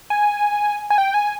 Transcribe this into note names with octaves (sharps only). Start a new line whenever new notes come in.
G#5
G#5
G5
G#5